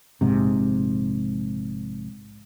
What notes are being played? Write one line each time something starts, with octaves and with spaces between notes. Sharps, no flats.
A#1 G#2 C3